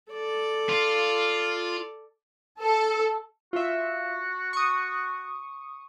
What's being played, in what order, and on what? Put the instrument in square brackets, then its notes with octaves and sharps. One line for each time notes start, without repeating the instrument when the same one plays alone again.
[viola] A4 D5
[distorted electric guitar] F4
[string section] A4
[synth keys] F4 E5 [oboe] F#4
[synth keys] C#6 D#6